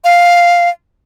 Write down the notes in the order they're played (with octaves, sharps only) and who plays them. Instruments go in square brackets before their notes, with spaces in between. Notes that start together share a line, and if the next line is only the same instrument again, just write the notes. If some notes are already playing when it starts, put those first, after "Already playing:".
[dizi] F5